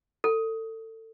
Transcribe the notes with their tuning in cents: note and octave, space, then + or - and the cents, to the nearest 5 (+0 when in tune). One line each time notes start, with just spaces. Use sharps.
A4 +25